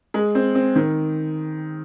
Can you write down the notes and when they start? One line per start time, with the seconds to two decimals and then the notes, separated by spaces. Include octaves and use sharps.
0.14 G#3
0.35 C4
0.55 C4
0.76 D#3